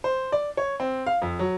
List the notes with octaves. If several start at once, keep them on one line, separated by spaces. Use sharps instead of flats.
C5
D5
C#5
C4
F5
F2
F#3